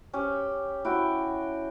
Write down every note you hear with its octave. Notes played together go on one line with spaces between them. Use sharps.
C#4 G4
E4 F#4 G5